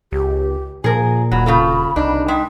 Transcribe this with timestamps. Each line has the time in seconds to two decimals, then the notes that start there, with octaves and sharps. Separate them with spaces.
0.12 C#2 G4
0.84 A#2 F3 G#4 A#4 G#5
1.31 D#1 F#3 B5
1.46 C#3 F4 A4
1.96 C2 D4 D#4
2.28 G#3 E5 G5